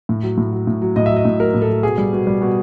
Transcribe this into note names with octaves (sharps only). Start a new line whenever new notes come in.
A2
F#3
A2
F#3
A2
F#3
A2 D#5
F#3 E5
D#5
A2
F#3 A#4
A2
A4
F#3
B2 G#4
G3
B2
G3
B2